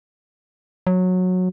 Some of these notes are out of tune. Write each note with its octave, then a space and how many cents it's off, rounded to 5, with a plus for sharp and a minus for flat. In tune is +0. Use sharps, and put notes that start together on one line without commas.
F#3 -15